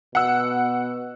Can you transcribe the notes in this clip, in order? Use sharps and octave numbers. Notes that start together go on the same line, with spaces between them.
B2 F#5 E6